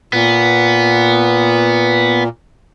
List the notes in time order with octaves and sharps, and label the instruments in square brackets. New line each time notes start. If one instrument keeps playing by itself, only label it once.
[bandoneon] A#2 [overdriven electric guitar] B3